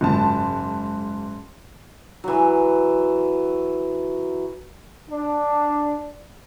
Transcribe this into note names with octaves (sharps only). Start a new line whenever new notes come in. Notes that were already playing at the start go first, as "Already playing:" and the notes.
F#1 G#2 A5
E3 F#3
D4